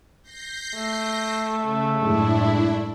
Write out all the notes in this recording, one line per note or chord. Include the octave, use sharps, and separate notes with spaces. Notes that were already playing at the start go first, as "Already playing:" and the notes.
G6 A#6 C7
A3
C#3
F#2 A2 G#3 D4 E4